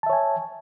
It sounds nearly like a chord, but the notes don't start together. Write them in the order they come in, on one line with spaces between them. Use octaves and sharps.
A5 E5 C#5 G#5